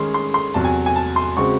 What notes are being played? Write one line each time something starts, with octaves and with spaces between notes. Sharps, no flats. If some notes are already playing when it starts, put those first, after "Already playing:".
Already playing: D#3 G#3 C#4 G#4 C6
C6
C6
E2 C3 F#3 A5
G#5
G#5
A5
C6
C#3 G#3 C4 F#4 C#6